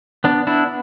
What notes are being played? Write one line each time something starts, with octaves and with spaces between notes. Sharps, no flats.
B3 D4
B3 D4 E4